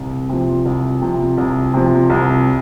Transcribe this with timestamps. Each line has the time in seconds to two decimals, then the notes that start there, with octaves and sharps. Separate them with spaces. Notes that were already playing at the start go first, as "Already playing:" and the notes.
Already playing: C2
0.29 C3 F3
0.66 C2
1.02 C3 F3
1.38 C2
1.74 C3 F3
2.10 C2